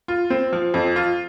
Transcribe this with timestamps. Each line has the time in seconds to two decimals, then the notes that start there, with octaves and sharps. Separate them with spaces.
0.08 F4
0.30 C4
0.53 F3
0.74 F2
0.96 F4